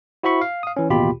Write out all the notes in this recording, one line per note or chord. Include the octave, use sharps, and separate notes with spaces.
E4 F#4 C5 E5 B5 C#6
F5
F5 D#6
E3 C#4
A1 D#2 B2 F4 G4 B5